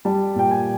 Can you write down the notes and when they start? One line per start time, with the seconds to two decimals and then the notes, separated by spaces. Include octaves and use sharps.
0.05 G3 A5
0.36 A#2 G5
0.51 G#5